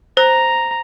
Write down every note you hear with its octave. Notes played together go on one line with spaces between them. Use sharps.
C5 A#5